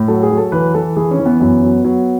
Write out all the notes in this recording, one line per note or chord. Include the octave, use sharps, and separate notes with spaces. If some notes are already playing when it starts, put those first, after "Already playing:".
Already playing: A2
F#3 A4
G#4
F#3
A4
E3 B4
E3 A4
E3 G#4
C#4
E3
B3
F#2 B3
F#3
F#3